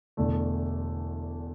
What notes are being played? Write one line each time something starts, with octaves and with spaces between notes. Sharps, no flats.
E1 E2 D3 A3